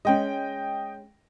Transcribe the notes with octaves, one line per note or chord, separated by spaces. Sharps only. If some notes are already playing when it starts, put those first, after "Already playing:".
G#3 C#4 D#5 G5